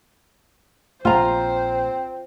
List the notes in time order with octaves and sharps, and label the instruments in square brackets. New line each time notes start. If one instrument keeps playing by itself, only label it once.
[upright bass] A#1 [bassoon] C4 [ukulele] F4 A#5 [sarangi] C5